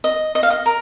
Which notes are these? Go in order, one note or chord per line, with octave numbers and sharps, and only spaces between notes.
D#5
D#5
F5
D#5
A#4